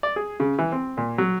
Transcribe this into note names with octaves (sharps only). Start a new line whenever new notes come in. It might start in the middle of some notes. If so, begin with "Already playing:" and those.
D5
G#4
C#3
E3
C4
A#2
F#3